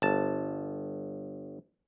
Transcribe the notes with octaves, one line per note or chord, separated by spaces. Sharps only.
G1 A5